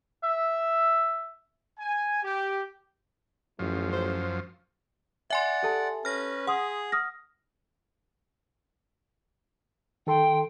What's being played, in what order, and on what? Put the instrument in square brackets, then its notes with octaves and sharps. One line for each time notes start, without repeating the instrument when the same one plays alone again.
[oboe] E5
[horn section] G#5
G4
[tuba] A1 [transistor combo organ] F#2 F3
[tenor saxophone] C5
[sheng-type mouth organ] D5 F#5 [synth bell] E5 G#5 C6
[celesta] G4 A4 A5
[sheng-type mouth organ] C#4 B4 [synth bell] F6 A#6
[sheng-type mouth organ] G#4 [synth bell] F#5 [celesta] C6 D#6
[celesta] D#6 F6 A#6
[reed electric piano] D#3 A4 C6 [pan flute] G5